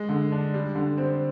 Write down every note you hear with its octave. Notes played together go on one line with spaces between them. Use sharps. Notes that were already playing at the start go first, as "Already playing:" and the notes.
Already playing: G#3
D3
D4
G3
D3
C4